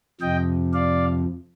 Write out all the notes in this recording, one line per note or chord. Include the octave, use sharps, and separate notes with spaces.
F2 C3 F3 D#5 G5
D5 F5